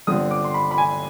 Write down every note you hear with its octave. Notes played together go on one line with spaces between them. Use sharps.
G1 G2 D3 F3 C4 D#6
D6
C6
B5
B5
G#5